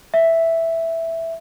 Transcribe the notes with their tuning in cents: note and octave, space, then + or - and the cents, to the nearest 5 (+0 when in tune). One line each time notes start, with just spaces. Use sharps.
E5 +0